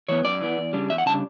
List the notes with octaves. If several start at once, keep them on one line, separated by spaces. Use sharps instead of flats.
E3 B3 C#5
F#2 D5
E3 B3
E2
C#3 G3 D4
E2 E5
F#5
C#3 G3 D4 A5